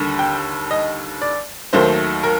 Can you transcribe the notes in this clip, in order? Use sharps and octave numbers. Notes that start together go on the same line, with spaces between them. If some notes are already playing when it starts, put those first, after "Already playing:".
Already playing: D#2 D3 G3
G5
D#5
D5
D#2 D#3 F#3 A3 C5
A#4